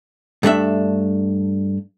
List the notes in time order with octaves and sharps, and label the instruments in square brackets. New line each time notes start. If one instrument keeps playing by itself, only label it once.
[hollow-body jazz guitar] G2 A3 D4 E5